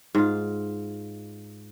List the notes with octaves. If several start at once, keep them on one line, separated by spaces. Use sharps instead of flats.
G#2 F4